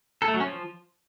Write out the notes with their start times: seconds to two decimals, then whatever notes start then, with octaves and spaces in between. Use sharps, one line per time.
0.22 A4
0.28 A3
0.34 F#3
0.40 C#4
0.46 F3